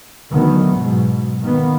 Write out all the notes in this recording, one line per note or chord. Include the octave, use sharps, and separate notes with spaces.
D2 D#3 E3 F#3 B3
G#2 B2 F#3
D#3 A#3 B3